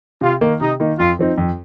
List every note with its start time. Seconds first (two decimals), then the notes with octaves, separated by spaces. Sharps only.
0.21 C3 F4
0.41 D#3 A#3 D#4
0.61 C3 D#4
0.80 D#3 A#3 D#4
0.99 F2 F4
1.19 F3 C4 D#4
1.38 F2